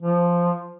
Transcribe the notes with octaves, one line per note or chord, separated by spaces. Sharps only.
F3